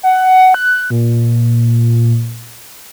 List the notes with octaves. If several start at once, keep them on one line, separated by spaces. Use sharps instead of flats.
F#5
F#6
A#2